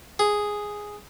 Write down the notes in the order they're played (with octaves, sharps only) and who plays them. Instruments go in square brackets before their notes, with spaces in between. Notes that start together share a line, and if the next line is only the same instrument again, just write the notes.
[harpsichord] G#4